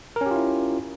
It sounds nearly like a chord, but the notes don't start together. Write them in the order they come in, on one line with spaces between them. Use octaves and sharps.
A#4 C#4 G4 F4 E4